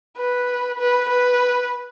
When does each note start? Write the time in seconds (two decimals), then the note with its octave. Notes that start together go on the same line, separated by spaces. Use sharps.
0.17 B4
0.79 B4
1.09 B4